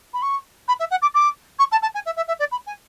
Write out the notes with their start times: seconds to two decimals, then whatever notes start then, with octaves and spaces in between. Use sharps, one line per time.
0.13 B5
0.22 C#6
0.68 B5
0.79 E5
0.91 F#5
1.02 D6
1.14 D6
1.59 C#6
1.71 A5
1.82 A5
1.94 G#5
2.06 E5
2.16 E5
2.27 E5
2.39 D5
2.51 B5
2.66 G#5